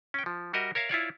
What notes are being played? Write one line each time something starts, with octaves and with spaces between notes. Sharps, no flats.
C#4 G5
F3
G3 F#4 A#4 D#5 E5
A#4 C#5 E5 F5
E4 F4 C#5 D5